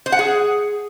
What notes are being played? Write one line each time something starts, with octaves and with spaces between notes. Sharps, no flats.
C5
F#5
G#4